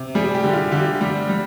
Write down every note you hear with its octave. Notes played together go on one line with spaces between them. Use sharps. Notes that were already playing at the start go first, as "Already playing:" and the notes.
Already playing: C3
G3 G#4
G4
D3
F4
D3 G4
G3
G3